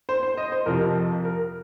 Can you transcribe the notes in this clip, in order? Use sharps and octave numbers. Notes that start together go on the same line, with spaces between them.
C5
C5
D#5
C5
F2 C3 F3 A#4
A#4